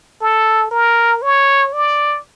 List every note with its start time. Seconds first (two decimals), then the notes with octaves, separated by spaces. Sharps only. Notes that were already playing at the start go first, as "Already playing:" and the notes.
0.21 A4
0.71 A#4
1.22 C#5
1.73 D5